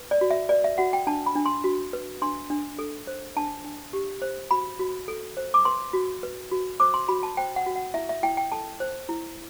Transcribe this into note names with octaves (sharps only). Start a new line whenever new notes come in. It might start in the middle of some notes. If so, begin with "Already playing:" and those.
Already playing: B4
D5
F#4
E5
B4 D5
E5
F#4 F#5
G5
D4 A5
B5
D4
C6
F#4
B4
D4 C6
D4
A4
C5
D4 A5
D4
G4
C5
F#4 B5
F#4
A4
C5
D6
B4 C6
F#4
B4
F#4
C5 D6
C6
F#4 B5
A5
C5 G5
F#5
F#4
F#5
E4 E5
E5
E4 G5
G5
A4 A5
C5
E4